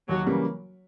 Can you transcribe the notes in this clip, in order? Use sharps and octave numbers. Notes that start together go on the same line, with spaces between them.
D#2 F#3
C#3 E3 G3 A#3